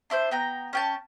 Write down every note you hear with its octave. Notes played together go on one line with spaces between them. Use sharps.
D4 E4 C5 G6
B3 G5 A#5
C#4 G5 A5